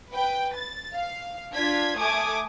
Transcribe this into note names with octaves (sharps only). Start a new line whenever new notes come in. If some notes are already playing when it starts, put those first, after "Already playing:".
B4 G5
A6
F5
D4 F4 G#6 B6
A3 G#5 D6 D#6 G#6